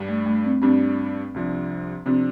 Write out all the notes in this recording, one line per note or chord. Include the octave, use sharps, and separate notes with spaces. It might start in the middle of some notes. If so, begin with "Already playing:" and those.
Already playing: G2 G3 D4
A3
A3
C4
G2 G3 C4 D4
C2 C3 F3 D4
C3 F3 C4 D4